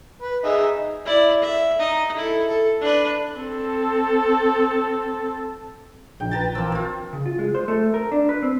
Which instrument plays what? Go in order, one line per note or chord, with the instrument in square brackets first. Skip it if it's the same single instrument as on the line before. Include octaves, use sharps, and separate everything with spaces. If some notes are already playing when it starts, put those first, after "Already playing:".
[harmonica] B4
D#4 G#4 E5
[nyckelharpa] E4 D5
E5
D#4 D#5
E4 A4
A4
D4 B4
[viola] C4 A4
[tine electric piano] A#1 [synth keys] C#3 D#4 [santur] G5
[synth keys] B4 A6 [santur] G5 A5 A#5
[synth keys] E3 A5 E6 [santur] A#3 C4
[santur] A#3 F4
[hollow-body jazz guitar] C#3
F4
G#3
C5
A3
A#4
D4
B4
C4